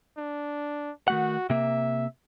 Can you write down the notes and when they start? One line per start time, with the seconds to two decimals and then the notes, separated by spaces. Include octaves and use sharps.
0.18 D4
1.08 D#3 A3 F#4 F#5
1.50 C3 A#3 E5